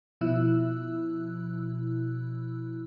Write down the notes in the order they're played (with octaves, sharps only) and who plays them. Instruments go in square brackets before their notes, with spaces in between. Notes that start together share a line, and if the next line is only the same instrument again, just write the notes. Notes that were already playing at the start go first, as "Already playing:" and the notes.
[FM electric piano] B2 F3 E4 E6 F#6